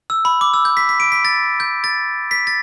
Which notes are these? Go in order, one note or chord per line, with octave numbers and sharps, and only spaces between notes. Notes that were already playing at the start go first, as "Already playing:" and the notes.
E6
B5
D6
E6
G6
B6
B6
D7
B6
A6
G6
A6
B6
A6